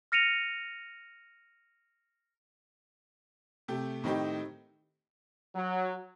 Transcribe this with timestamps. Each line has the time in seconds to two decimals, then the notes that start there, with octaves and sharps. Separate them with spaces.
0.12 F6 A#6 C#7 D#7 F7
3.68 C3 A3 G4
4.04 A2 D#3 C4 D#4 G4
5.55 F#3